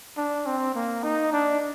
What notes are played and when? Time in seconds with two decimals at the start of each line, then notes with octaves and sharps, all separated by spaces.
0.17 D4
0.46 C4
0.75 A#3
1.04 D#4
1.33 D4